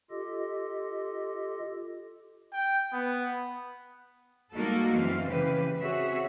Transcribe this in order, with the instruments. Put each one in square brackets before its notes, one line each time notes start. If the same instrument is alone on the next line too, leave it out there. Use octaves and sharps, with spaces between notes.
[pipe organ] F4 G4 A4 D#5
[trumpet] G5
B3
[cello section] G3 G#3 A#3 D#4 F#4 A4
F#2 E3 C4 F5
C#3 E3 G4 B4
C4 F#4 G#4 C#5 E5